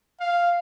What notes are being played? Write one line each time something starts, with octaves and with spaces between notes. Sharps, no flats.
F5